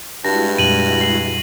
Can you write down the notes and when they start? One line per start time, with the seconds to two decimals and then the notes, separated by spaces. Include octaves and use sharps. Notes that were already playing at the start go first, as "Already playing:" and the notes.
0.25 G2 G#3 E4 F#4 A5 A#6
0.58 F2 A#2 G3 D#7 F#7
1.01 C7 F#7